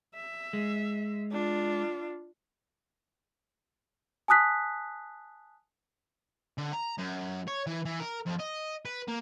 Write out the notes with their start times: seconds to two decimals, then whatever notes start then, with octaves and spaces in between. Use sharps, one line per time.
0.16 E5
0.53 G#3
1.32 D4 F4
4.28 G#5 A5 D#6 F#6 B6
6.58 D3
6.73 A#5
6.98 F#2
7.48 C#5
7.67 E3
7.85 E3
8.00 A#4
8.26 F2
8.39 D#5
8.85 B4
9.08 A#3